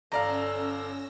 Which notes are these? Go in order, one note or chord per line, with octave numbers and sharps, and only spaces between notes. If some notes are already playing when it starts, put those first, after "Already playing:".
G1 C#4 A4 D5 F5 A#5 E6 A#6